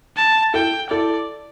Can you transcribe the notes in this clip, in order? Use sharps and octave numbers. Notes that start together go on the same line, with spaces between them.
A5
E4 A4 G5
E4 A4 D5